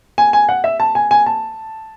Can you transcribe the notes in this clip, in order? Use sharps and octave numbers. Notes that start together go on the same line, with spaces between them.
G#5
G#5
F#5
E5
A5
G#5
G#5
A5